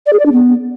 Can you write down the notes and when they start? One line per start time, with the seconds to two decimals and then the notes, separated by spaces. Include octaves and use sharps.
0.06 D5
0.13 G#4
0.19 D5
0.26 D4
0.32 B3